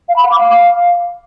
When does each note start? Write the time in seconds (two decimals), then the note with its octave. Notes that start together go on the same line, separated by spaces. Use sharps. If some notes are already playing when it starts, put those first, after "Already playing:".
0.08 F5
0.16 B5
0.23 F#5
0.31 D6
0.38 F5